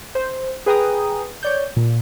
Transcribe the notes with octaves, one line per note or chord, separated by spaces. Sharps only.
C5
G#4 B4 G5 G#5 A#5 D#6
C#5 D5 G6
A#2